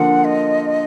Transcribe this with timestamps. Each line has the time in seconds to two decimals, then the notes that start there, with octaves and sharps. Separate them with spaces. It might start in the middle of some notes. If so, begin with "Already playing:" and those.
Already playing: D3 F3 A#3 F#5
0.24 D#5